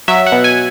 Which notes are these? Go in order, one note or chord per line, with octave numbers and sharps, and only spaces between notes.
F#3 E5
F#5
B2
G#5